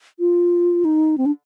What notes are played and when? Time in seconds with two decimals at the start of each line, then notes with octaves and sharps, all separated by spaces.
0.20 F4
0.85 D#4
1.18 C4
1.26 D4